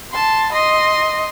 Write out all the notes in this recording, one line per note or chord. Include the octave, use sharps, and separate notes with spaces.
A5 C6
D#5 C6